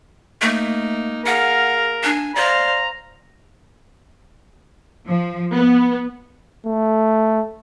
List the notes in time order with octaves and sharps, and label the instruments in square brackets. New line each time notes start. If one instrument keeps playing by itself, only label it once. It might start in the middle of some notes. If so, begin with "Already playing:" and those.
[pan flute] A3 [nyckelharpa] A#3 D#4
[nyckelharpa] G#4 F5 [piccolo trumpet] A#4 [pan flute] F#5
[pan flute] D4 [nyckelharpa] G#5
[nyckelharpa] C5 F5 [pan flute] D5 [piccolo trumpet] A#5
[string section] F3
B3
[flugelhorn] A3